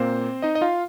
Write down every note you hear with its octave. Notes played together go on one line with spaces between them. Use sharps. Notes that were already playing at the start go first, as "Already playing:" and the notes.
Already playing: A#2 A#3 C4 C5
D#4 D#5
D#5
F4 F5